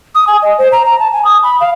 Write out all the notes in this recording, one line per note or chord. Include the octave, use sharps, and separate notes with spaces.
D#6
G#5
D#5
C5
A#5
A#5
A5
G#5
D#6
B5
F5